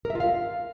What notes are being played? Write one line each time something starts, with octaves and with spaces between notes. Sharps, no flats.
A#4
E5
F4
F5